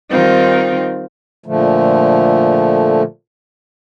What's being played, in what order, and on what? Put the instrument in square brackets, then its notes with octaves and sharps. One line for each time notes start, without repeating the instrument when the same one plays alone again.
[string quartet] D#3 G3 C4 D#4 F4
[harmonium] A#2 D3 F3 A3